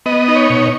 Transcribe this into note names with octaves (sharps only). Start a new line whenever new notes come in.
B3 D#5
D#4
C#5
B2